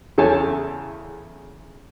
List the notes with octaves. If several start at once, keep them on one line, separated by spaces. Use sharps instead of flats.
E2 C#3 A4 C#5 G#5 A5